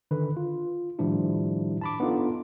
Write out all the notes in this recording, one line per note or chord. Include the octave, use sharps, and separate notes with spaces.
D3 D#3 B4
F4
A2 D#3 F3 G3 D4 E4
A5 B5 D6
B3 D4 D#4 F4 A4